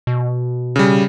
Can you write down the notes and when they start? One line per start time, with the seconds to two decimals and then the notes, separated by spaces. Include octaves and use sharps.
0.07 B2
0.76 C#3 G3